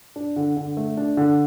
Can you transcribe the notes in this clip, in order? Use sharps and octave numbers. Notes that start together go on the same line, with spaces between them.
D4
D3
D3
A3
D4
D3